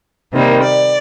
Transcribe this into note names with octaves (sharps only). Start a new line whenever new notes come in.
C3 D#3 G3 A#3
D5